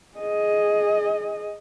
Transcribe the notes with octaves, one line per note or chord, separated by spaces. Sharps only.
G#4 D#5